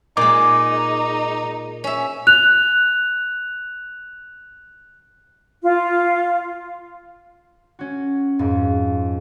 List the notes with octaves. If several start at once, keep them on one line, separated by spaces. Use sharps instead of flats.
A#2 G#3 D#4 D6
C#4 E5
F#6 F7
F4
C#4 F#4
F2 G#2